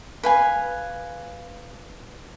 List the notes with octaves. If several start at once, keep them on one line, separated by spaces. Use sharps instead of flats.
B4 F5 G#5